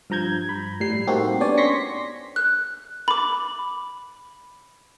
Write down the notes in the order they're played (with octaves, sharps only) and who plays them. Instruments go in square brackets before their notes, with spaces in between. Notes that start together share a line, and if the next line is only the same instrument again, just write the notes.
[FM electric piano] G2 F3 A#5 G6 G#6
B5
A2 G3 C7
A#3 C4 D#4 F#4 G4 A4
B3 C#4 D4 C#5 D5 G#5
C6 C#6 A#6 B6 C#7
[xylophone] F#6
B5 D6